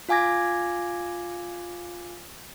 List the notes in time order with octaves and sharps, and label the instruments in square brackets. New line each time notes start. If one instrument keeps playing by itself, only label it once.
[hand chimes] F4 F5 G#5 D6 G#6 A#6